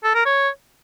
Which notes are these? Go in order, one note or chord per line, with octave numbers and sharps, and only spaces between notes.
A4
A#4
C#5